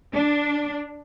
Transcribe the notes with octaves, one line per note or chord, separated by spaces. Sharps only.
D4